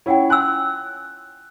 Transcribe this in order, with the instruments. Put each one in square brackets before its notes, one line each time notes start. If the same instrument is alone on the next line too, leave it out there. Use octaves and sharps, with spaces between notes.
[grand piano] C#4 E4 [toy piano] F4 F#5 G5
[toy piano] G#5 C6 E6 [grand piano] F#6